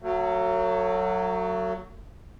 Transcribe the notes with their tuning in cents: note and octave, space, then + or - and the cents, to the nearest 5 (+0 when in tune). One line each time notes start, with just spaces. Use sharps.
F#3 +0 A3 +40